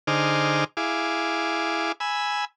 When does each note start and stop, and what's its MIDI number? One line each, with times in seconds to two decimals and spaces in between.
0.07 0.64 50
0.07 0.64 63
0.07 0.64 68
0.07 0.64 72
0.07 0.64 86
0.07 0.64 89
0.77 1.92 64
0.77 1.92 68
0.77 1.92 77
0.77 1.92 86
2.00 2.45 80
2.00 2.45 83
2.00 2.45 88